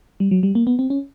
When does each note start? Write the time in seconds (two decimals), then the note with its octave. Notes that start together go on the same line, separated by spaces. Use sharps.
0.20 G3
0.31 F#3
0.43 G3
0.55 A#3
0.67 B3
0.79 C4
0.90 C#4